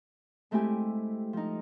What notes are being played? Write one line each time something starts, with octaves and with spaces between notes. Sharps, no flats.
G#3 A3 C4 E4 G4 G#5
F3 D#4